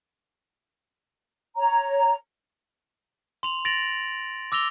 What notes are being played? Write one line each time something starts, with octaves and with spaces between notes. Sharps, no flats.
C#5 A#5
C6 F7 F#7
A6 A#6 D7 F7 F#7
D6 E6 A#6 F7 G7